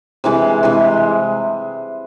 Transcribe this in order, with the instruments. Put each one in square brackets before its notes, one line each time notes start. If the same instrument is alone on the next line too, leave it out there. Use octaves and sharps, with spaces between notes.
[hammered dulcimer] C3 E3 G#3
C3 E3 G#3